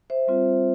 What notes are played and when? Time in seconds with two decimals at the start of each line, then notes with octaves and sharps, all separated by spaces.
0.10 C5 E5
0.27 G3 C4 F4